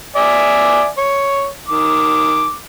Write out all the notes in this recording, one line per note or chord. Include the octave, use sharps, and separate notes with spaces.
D5 E5 G#5
C#5
D#3 D6